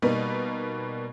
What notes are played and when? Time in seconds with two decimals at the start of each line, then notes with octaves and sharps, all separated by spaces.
0.02 B2 G3 A#3 D#4 B4